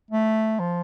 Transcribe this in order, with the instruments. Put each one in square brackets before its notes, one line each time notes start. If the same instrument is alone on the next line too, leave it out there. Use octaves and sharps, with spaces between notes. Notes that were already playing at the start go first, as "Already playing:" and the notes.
[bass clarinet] A3
F3